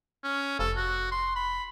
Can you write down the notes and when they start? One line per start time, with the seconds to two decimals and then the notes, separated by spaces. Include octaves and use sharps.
0.24 C#4
0.59 F1 A4
0.77 F#4
1.11 C6
1.36 B5